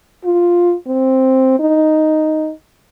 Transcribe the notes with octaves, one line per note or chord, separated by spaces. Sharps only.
F4
C4
D#4